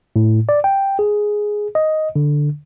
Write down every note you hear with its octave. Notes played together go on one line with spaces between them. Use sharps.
A2
D5
G5
G#4
D#5
D3